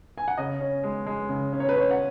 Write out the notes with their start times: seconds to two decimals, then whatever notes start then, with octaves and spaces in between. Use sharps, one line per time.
0.18 G#5
0.28 F#5
0.38 C#3 D#5
0.60 C#4
0.84 G#3
1.07 G#3
1.29 C#3
1.53 C#4
1.60 C#5
1.69 B4
1.75 C#4 C#5
1.91 F#5